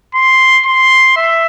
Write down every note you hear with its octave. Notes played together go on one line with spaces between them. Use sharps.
C6
C6
E5